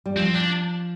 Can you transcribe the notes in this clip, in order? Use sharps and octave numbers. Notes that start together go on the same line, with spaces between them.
G3
F3 C4
D4